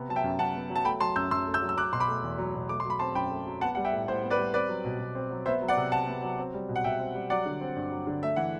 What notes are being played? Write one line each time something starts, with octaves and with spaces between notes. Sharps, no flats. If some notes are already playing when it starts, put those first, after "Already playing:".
Already playing: C3 B3
F#3 A5
E5 G5
F#2
F#2 F#5 A5
B3
F#3
A5
A3 G5 B5
F#3 A5 C6
F#2 E6 G6
F#2 C6 E6
A3
E6 G6
F#3
E6
F#3 D6 F#6
B2 C6
B5 D6
A3
E2
F#3
B2
A3 D6
F#3 C6
B5
C4 A5 C6
F#2 G5 B5
A3
F#3
B3 F#5 A5
G3 F#5
E5 G5
A2
A2 C5
B3
B4 D5
G3
C4 B4 D5
F#3
B2
B2
C4
F#3
B3 C5 E5
F#3
D5 F#5
C3
C3 F#5 A5
B3
F#3
C4
G3
B2
F#5
B2 E5 G5
C4
G3
F#3 D5 F#5
D3
C4
G2
F#3
D3
A3 E5
E3 F#5